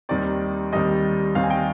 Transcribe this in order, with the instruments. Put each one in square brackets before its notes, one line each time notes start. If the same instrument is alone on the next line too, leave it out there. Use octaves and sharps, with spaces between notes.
[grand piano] D#2 D#3 G3 C4 D5
D#2 D#3 G3 C4 D#5
D#2 D#3 G3 C4 F5
G#5
G5